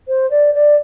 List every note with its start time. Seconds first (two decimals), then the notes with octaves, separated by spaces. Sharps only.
0.07 C5
0.30 D5
0.54 D5